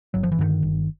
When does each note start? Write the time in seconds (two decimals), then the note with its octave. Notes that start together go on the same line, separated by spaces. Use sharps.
0.14 G1 F#3
0.23 F3
0.32 E3
0.38 G2 D3 D#3 F3
0.63 G1